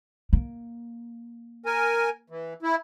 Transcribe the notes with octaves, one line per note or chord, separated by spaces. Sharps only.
A#3
A#4 G#5
E3
E4